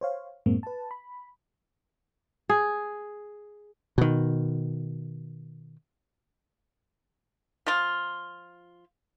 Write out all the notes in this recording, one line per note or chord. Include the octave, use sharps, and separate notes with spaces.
C5 C#5 F5
F#2 A2 G#3 A#3 C4
B4 A5
B5
G#4
B2 D#3
F3 F4